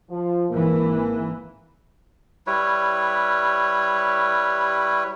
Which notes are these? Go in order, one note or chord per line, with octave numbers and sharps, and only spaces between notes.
F3
G#1 E3 A#3
G3 E4 B4 C#5